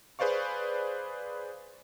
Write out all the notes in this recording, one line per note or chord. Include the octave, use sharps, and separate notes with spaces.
G#4 B4 C5 D5 F5 C#6